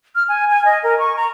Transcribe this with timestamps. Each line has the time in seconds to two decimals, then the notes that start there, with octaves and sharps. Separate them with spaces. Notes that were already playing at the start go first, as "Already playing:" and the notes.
0.15 F6
0.29 G#5
0.50 G#5
0.65 D#5
0.83 A#4
0.99 C#6
1.17 A#5